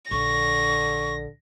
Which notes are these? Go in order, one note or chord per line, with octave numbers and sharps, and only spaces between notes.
A#1 D3 C#6 A#6